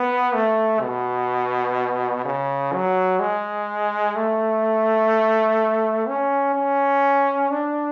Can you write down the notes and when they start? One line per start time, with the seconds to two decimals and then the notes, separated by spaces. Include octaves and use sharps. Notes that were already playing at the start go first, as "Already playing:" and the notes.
Already playing: B3
0.35 A3
0.82 B2
2.25 C#3
2.73 F#3
3.20 G#3
4.16 A3
6.07 C#4
6.55 C#4
7.50 D4